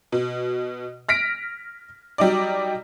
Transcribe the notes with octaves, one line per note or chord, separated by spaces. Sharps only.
B2
F6 A#6 B6 D7
F#3 G3 D#4 D5